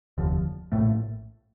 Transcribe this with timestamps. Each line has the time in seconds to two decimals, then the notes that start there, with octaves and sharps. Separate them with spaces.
0.18 F1 D#2 D3 F3
0.72 A#1 A2 A3